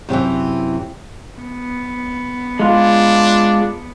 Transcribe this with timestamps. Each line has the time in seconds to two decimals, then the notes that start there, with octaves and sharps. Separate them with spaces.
0.09 F#2 C3 D#3 E3
1.40 B3
2.60 G#3 D4 F4